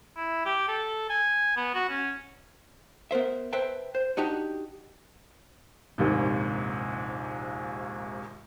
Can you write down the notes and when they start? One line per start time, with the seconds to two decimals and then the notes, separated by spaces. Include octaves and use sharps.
0.16 E4
0.45 G4
0.68 A4
1.09 G#5
1.56 B3
1.74 F#4
1.89 C#4
3.11 B3 A#4 C5 E5
3.53 B4 C5 E5 G5 A5
3.95 C5
4.17 D4 D#4 F#4 G4
5.98 A#1 D#2 G#2 C3